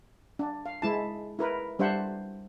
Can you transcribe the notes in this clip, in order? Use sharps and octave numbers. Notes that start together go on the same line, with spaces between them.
D4
F5
G#3 E4 A5
E4 A#4 B4
G3 D4 C5 E5 F#5